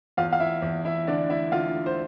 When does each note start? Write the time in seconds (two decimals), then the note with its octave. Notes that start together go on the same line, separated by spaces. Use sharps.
0.17 E2 F4 F5
0.33 F5
0.40 E4 E5
0.62 E2
0.85 E4 E5
1.07 D3 D4 D5
1.30 E4 E5
1.52 D3 F4 F5
1.86 C5